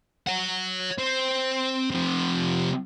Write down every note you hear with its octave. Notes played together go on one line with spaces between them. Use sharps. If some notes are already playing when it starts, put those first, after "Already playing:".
C#5 F#5
C4
C3 F3